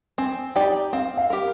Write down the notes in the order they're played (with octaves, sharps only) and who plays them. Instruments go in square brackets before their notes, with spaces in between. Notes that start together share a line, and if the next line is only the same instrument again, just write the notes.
[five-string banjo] C4 [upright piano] G#5
[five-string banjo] D#4 G4 D5 [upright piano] G5
[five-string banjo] C4 [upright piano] F5
[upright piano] F5
[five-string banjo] G4 A#4